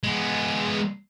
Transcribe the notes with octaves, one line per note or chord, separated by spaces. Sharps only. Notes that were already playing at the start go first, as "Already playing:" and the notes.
G#3 B3